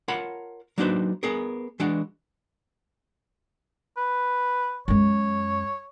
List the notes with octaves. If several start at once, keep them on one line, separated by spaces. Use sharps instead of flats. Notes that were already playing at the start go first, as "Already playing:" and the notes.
F4 A#4 C#5 F#5 A5 B5
F#3 A#3 D4 D#4 B4 C5
B3 G#4 A#4
E3 G#3 D4 F#4
B4
F#2 G#3 C#5